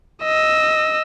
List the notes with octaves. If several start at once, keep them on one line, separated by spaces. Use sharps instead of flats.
D#5 E6